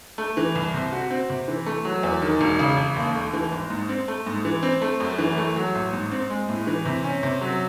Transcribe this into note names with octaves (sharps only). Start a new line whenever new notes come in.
A3
E3
C2
C3
F#4
C4
C3
E3
A3
F#3
E2
D#3
E1
C#3
E1
D#2
A3
E3
G#1
G#2
C4
A3
G#2
E3
C4
A3
F#2
E3
A3
F#3
A1
G#2
C4
G#3
A2
E3
C3
C#4
C3
F#3